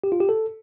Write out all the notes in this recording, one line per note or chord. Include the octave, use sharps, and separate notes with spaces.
G4
F4
G4
A4